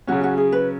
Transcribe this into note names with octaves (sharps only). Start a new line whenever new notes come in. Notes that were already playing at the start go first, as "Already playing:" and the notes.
C#3 F#3 C#4 F#4
F#4
G#4
B4